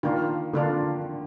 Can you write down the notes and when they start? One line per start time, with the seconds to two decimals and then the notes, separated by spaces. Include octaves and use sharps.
0.03 D#3 A#3 D4 F4
0.53 D3 A#3 D4 F4